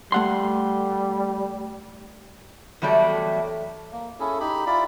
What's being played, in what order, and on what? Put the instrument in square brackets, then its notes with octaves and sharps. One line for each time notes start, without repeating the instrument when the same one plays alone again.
[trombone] G3 [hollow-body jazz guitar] A3 F#5 C6
[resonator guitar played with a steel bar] E2 F#3 G3 A3 D5
[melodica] A#3
C#4 E4 G#4 A4
D#4 G4 B5
E4 F4 D5 B5